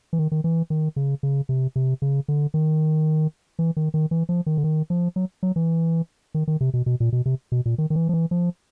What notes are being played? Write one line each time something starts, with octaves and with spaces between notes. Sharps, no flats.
E3
D#3
D#3
E3
D#3
C#3
C#3
C3
C3
C#3
D3
D#3
E3
D#3
D#3
E3
F3
D#3
D3
D#3
F3
F#3
F#3
E3
D#3
D#3
C3
B2
B2
A#2
B2
C3
B2
A#2
D#3
D#3
E3
F3
E3
F3